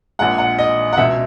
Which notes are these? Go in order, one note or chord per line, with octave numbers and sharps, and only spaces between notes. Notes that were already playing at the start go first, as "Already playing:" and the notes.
A#1 A#2 G#3 F#5
F#5
D#5
F#5
C#2 B2 G#3 E5